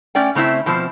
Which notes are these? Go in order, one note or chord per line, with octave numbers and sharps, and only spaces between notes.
A3 C#4 D5 G5
C#3 A3 C4 E4 E5
B2 F3 C4 C5